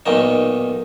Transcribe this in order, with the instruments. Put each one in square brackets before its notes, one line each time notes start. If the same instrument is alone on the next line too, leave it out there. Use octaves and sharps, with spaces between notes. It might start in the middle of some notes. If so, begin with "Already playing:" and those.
[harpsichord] B1 A#2 D#3 D#4